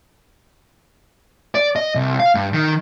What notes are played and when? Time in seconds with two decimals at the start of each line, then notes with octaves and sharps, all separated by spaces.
1.55 D5
1.76 D#5
1.95 C2
2.20 F5
2.35 G2
2.53 D#3